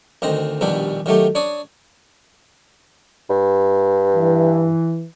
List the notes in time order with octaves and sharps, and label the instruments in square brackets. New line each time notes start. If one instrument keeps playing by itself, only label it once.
[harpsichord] D2 D#3 C4 D#5
A#1 D#2 B2 G3 D4 G5
D#3 F#3 A3 G4
D4 C#5 D5 D#6
[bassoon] G2
[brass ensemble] E3